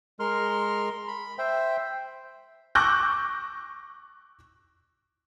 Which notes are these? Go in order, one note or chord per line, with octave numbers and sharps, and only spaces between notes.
G#3 A#4 C6 F6
B5
C5 E5 G5
C#6 D6 E6 F#6 G6 A#6